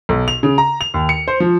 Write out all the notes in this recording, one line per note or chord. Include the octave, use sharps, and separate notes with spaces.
B1
F7
C#3
A#5
F7
D#2
C#7
C5
F3